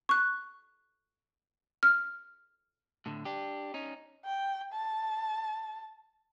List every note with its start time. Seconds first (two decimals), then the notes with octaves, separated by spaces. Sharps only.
0.09 C#6 F#6
1.83 F6
3.06 A2 D3
3.25 D4 G4
3.74 C#4 D#4
4.25 G5
4.73 A5